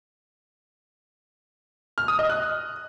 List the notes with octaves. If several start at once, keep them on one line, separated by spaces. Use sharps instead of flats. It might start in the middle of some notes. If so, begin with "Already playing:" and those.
F6
D#6
D#5
F#6